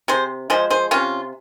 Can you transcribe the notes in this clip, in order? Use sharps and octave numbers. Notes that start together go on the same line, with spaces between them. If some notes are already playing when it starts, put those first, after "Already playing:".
C3 G#4 C5
F3 G#3 G#4 C5
G#4 C5
C3 C#4 F4